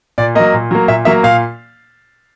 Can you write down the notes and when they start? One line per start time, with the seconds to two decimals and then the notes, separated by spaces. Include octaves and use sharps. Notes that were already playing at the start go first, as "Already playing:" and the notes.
0.18 A#2 D5
0.35 F#3 A#3 D#5
0.54 A#2
0.71 F#3 A#3
0.88 A#2 E5
1.05 F#3 A#3 E5
1.23 A#2 F5